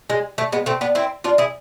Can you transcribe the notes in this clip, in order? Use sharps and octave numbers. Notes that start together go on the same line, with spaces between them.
G#3
A3
G#3 B3
A3 C4
B3 D4
C4 E4
D4 F4
E4 G#4